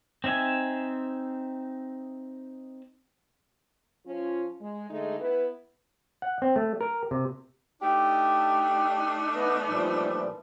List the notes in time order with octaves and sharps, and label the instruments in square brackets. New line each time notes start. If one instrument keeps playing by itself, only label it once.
[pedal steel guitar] C4 D#4 E5 G#5
[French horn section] F3 C#4 F4
G#3
D3 G#3 A3 D#4
B3 E4 B4
[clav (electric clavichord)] F#5
C4
A3
A#4
C3
[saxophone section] A3 D4 D#4 [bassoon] G4
[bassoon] E3 [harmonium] B3 B4 D#5
[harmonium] A#2 F3 G3